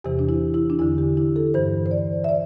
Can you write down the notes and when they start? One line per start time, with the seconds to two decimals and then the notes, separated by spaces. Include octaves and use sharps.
0.04 E2 C3 E3 G4
0.19 D4
0.29 E4
0.54 E4
0.70 D4
0.79 E2 D3 E4
0.98 G4
1.17 E4
1.36 A4
1.54 G2 E3 C5
1.86 C5
1.91 D5
2.24 E5
2.29 D5